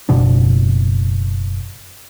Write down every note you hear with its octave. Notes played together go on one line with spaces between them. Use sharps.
F#1 B2 F3 D4